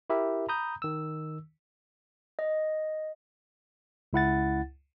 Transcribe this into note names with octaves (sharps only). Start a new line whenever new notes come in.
E4 G4 A#4 E5
A#5 B5 D#6 G6
D#3 E6
D#5
C#2 E4 F#5 A6